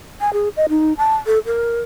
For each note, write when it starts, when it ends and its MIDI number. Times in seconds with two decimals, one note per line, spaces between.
0.21 0.33 80
0.33 0.49 68
0.57 0.66 75
0.69 0.93 63
0.98 1.15 81
1.26 1.39 69
1.46 1.81 70